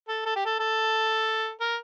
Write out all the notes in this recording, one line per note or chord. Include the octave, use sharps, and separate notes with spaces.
A4
A4
G4
A4
A4
A#4